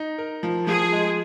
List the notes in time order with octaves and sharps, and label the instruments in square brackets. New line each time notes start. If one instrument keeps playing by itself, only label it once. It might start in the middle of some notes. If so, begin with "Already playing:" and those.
Already playing: [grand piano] D#4
A#4
F3
[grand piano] F3 [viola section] G#4
[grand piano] G#3